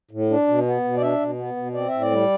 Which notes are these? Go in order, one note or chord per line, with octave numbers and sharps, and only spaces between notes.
A2
D4
B2
B3
B2
D5
D4 E5
B2
B3
B2
C4 D5
A2 E5
D5
G3